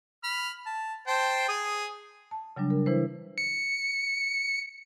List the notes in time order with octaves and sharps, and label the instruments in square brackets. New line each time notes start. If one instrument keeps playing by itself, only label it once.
[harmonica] B5 F6
A5
C5 G5 A5
G#4 D#6
[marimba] A5
C#3 F#3 G3 D4
A#4
E3 E4 B4 C5
[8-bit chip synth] C#7